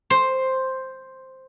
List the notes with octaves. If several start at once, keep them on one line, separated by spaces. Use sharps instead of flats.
C5